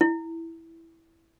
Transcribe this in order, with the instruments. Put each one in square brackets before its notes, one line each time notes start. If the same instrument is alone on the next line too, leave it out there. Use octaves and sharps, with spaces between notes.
[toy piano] E4